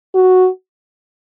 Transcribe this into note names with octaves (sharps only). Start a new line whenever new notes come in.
F#4